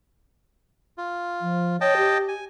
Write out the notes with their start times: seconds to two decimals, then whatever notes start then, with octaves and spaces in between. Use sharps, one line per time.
0.98 F4
1.41 F3
1.81 C#5 D#5 G5 A5
1.97 G4
2.28 G#5